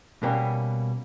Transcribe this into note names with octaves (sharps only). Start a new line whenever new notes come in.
B2 G3 A#3 C#4